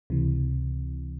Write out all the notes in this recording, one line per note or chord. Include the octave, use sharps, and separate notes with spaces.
C#2 C3 E3